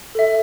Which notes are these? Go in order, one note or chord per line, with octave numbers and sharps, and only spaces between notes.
A4 E5